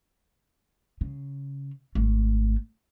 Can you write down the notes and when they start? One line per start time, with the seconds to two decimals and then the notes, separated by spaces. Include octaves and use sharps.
1.01 C#3
1.95 G#1 A3